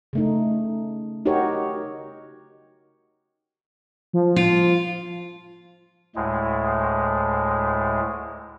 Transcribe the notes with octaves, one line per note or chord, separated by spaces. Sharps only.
C#3 A3 D#4
D#4 F#4 G4 A#4 C#5
F3
F4
D2 A2 G#3